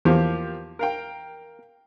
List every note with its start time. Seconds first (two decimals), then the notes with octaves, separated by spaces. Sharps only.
0.05 E2 F3 A#3 G4
0.79 A#4 F5 G5